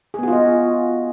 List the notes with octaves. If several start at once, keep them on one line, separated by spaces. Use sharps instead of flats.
B3 F4 F#4 G#4 D#5